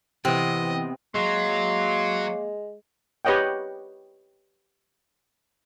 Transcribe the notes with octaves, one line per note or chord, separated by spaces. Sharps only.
C3 E3 B3 C4 D#5
F#3 G#3 A#3 C6
G4 B4 C#5 D#5 F#5 G5